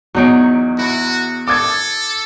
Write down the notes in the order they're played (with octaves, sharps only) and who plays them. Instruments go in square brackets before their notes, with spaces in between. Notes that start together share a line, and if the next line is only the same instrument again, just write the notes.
[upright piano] E2 D7 [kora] F#3 D#4 C#5
[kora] E4 [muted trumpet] F#4
[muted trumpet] A4 [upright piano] D6 D#6 G#6